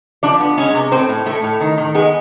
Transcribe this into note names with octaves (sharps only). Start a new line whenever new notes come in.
F3 D4 D5
B3
G#3 C#4 C#5
C3
A2 C4 C5
A2
A2 A3 A4
A2
D#3
D#3
G#3 B3 G#4